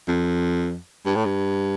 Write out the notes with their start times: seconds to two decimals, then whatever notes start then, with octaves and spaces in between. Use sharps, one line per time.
0.08 F2
1.05 G2
1.16 A2
1.25 G2